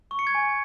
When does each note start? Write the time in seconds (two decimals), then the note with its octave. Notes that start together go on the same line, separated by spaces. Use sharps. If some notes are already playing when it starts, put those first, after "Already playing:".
0.11 C#6
0.19 C#7
0.27 G#6
0.35 G#5